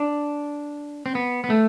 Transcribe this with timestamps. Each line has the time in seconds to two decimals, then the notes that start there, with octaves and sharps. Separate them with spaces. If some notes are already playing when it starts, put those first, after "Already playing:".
Already playing: D4
1.06 C4
1.15 B3
1.44 B3
1.50 A3